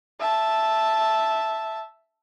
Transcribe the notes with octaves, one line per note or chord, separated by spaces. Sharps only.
E5 A5